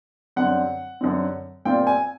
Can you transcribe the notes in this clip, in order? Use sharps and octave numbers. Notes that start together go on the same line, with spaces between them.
F#2 D3 G3 C4 F#5
F#2 D3 G3 C4
A#2 G3 C4 F4 G5
G#5